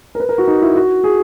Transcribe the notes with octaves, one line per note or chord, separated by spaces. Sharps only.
A#4
B4
A#4
F#4
D#4
E4
F#4
G#4